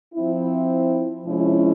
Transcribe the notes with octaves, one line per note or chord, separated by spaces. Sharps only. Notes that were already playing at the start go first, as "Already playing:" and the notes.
F3 C4 E4
C3 F3 G#3 C#4 E4